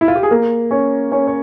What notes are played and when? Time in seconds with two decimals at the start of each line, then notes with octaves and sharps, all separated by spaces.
0.01 E4
0.08 F4
0.15 G4
0.23 G#4
0.31 A#3 A#4
0.71 C#4 C#5
1.12 C#4 C#5
1.27 C#5